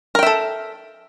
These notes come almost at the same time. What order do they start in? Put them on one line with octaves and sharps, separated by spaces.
A#4 G5 E5 A4